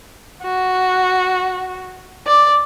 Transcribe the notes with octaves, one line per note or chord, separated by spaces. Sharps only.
F#4
D5